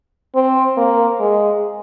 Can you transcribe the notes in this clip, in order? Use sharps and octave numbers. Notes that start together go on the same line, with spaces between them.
C4
A#3
G#3